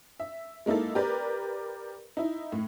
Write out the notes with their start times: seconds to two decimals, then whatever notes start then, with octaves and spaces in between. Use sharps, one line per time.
0.20 E5
0.66 G#3 A#3 D#4 E4 A4
0.95 G4 A#4 B4 D5
2.17 D#4 E4
2.52 A2